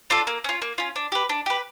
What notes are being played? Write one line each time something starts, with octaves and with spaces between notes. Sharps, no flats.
D4 F4 A4
A#3
C#4 F4
A#3
C#4 F4
D4
G4 B4
D4
G4 B4